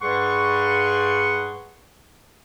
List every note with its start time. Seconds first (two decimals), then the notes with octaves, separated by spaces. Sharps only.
0.02 G2 G3 G#4 F#5 C6 C#6